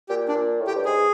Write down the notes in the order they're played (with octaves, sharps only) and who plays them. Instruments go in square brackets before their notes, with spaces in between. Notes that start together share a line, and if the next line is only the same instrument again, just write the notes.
[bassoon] A#2 [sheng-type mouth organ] G4
[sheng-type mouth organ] D4
[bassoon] A#2
A2
[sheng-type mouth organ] G4
[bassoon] G2
[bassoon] G#2 [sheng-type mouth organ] G#4